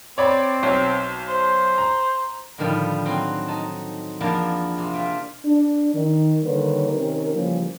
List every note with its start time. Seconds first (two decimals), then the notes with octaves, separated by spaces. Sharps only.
0.18 C4 C#5 D5 B5
0.63 B1 C#5
1.28 C5
1.78 A#5
2.58 A2 D3 D#3 F3 G3
3.06 F#3 C4
3.48 D#4 A5
4.20 E2 F3 A#3 D4 E4 A5
4.78 C3
4.94 F4 E5 G5
5.45 D4
5.94 D#3
6.43 D3 D#3 G3 A#3 B4 C#5
6.91 C3 D#3 C#4 A#4
7.33 C#3 E3 F3 G3 A#3 C#4